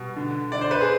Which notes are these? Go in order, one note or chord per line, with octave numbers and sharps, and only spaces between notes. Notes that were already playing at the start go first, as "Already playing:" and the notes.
Already playing: B2 G3
D3
D3 D5
C5
B4
G#4